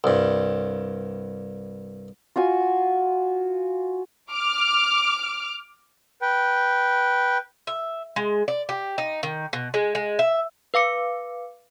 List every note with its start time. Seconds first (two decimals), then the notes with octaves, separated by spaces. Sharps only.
0.04 C2 G2
2.36 F4 F#4 G#5
4.31 D6 F6
6.22 B4 G5
7.67 E5
8.16 G#3
8.48 D5
8.69 G4
8.98 D#4
9.23 D#3
9.53 B2
9.74 G#3
9.95 G#3
10.19 E5
10.74 B4 F5 D6 C#7